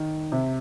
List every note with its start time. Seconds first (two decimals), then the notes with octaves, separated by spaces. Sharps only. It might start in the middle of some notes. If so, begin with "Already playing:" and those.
Already playing: D#3
0.32 C3